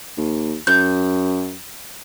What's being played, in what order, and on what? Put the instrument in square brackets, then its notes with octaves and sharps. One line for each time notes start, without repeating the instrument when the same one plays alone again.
[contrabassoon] D#2
[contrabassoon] F#2 [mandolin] G6